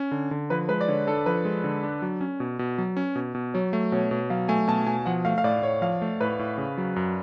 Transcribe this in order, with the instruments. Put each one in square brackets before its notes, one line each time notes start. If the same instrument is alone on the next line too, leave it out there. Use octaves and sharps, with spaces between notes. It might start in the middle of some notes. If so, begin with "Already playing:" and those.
Already playing: [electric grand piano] C#4
D3
D3
[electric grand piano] F3 [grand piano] B4
[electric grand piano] G#3 [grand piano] B4
[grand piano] D5
[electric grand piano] D3 [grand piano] C#5
[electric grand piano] D4 [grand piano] A4
[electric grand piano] F3 [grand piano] B4
[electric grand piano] G#3
D3
D4
F#3
C#4
B2
B2
F#3
C#4
B2
B2
[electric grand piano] F#3 [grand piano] C#5
[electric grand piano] A3
[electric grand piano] B2 [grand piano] C#5
[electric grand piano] B2
[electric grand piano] F#3 [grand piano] F5
[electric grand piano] A3 [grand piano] G#5
[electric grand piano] B2 [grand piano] A5
[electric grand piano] B2 [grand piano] G#5
[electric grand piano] F3 [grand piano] F#5
[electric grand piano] A3 [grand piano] F5
[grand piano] F5
[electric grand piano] A2 [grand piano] D5
[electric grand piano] A2 [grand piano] C#5
[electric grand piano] F3 [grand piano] F5
[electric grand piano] A3
[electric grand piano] A2 [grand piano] B4
[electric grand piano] A2
C#3
F#3
F#2